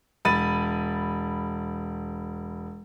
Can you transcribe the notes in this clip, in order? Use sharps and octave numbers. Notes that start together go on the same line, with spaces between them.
E1 B5 A6 D#7